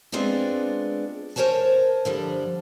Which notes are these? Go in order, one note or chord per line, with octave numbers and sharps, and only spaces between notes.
G#3 B3 C4 D4 F4 G#4
A#4 C5 C#5 G#5 A5
D3 F3 G3